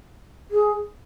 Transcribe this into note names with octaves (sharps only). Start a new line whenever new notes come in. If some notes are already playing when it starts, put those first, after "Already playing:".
G#4